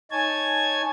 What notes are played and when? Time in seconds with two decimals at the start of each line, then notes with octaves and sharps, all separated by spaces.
0.11 D#4 C#5 G#5 A5 G#6